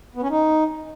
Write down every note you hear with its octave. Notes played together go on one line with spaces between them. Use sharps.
B3
C#4
D#4